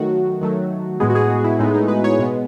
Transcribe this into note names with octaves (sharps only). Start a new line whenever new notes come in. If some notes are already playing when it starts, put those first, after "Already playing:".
Already playing: D#3 F#3 A3 F#4
D#3 F#3 A3
A2 G#3 B3 G#4
F#4
G#4
F#4
E4
A2 G#3 B3 D#4
D#4
B4
C#5
B2 G#3 B3